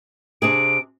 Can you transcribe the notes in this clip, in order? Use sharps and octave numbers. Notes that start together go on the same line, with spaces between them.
C3 D4 G#4 D7